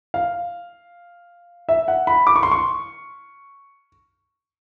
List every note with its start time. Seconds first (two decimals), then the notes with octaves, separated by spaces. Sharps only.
0.14 F5
1.69 E5
1.88 F#5
2.07 B5
2.27 D6
2.36 C#6
2.43 C6
2.51 C#6